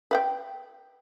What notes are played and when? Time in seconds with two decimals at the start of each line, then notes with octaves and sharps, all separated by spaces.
0.11 B4 F#5 G5